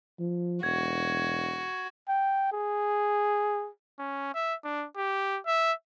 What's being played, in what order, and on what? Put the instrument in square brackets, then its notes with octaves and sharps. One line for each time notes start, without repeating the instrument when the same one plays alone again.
[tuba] F3
[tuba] E1 [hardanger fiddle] F#4 [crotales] G#6
[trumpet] G5
G#4
C#4
E5
D4
G4
E5